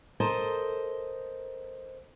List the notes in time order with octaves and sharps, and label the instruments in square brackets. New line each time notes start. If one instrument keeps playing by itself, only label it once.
[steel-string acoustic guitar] A4 A#4 C5 D#5